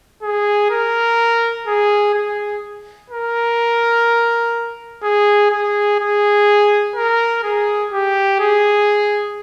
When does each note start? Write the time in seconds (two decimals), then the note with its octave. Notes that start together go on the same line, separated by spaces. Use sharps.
0.23 G#4
0.71 A#4
1.67 G#4
2.14 G#4
3.10 A#4
5.03 G#4
5.51 G#4
5.99 G#4
6.96 A#4
7.43 G#4
7.92 G4
8.40 G#4